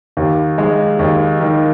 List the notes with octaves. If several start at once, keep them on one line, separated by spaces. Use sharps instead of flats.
D#2
G#3
D#2
D#3